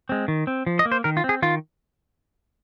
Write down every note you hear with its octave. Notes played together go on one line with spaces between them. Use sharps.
G#3 C4
D#3
C4
F3
D#5
A#3
C5
D#3 A#4
F4
C4
G#4
D#3 F4